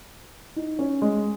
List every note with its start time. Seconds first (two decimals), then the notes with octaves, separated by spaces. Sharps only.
0.56 D#4
0.79 C#4
1.02 G#3